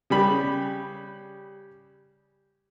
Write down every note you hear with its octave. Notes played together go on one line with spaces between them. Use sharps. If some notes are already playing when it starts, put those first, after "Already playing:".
C#3 G3 B5